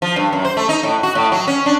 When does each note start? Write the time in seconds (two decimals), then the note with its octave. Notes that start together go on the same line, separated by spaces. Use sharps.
0.02 F3
0.16 G2
0.33 F#2
0.45 C5
0.57 A3
0.69 D#4
0.83 A2
1.03 F#4
1.15 A2
1.32 F#3
1.47 C#4
1.66 D4